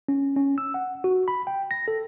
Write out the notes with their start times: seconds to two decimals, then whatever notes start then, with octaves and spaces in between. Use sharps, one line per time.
0.09 C#4
0.36 C#4
0.58 E6
0.74 F#5
1.04 F#4
1.28 B5
1.47 G5
1.71 A#6
1.88 A4